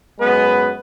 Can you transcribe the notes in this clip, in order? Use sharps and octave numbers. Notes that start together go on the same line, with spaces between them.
F#2 G#3 B3 B4